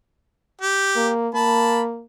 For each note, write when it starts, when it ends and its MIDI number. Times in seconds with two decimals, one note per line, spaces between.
0.61 1.10 67
0.96 1.29 58
1.34 2.04 58
1.34 1.82 81
1.34 1.82 83